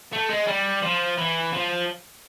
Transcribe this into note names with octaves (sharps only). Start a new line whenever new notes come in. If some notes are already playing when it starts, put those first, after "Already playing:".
A3
G#3
G3
F3
E3
F3